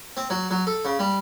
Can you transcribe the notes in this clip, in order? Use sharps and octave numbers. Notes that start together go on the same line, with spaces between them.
C4
F#3
F#3
A4
C#3
G3